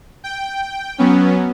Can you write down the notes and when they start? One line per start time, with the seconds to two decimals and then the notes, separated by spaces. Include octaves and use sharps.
0.24 G5
0.98 F#3 B3 C#4